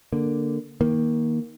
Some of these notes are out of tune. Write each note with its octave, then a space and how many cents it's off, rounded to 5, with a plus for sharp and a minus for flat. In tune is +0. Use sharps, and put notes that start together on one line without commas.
D3 +0 A#3 +0
D#3 +15 A#3 +15